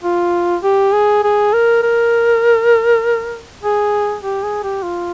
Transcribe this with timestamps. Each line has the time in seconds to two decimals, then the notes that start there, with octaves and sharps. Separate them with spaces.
0.03 F4
0.63 G4
0.93 G#4
1.24 G#4
1.53 A#4
1.83 A#4
3.63 G#4
4.23 G4
4.43 G#4
4.63 G4
4.83 F4